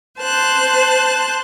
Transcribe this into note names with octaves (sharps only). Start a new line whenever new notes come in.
C5 A5 F#6